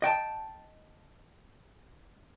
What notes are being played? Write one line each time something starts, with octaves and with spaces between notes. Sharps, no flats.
D#5 G5 A5